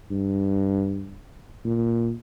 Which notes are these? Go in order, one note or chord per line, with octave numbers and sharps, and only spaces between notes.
G2
A#2